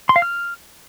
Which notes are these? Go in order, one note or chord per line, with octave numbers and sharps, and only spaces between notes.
C6
F5
F6